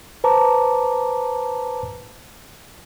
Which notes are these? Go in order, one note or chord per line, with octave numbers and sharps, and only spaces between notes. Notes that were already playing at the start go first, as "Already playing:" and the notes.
B4 C5 A5 A#5 D6